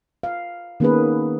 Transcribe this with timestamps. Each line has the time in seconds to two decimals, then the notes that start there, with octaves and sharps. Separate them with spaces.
0.23 F5
0.80 D#3 A#3 B3 C#4 G#4 B4